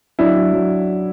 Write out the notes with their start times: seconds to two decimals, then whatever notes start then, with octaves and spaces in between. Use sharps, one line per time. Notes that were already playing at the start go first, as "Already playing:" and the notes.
0.19 F#3 D4 E4
0.36 F#3
0.53 F#3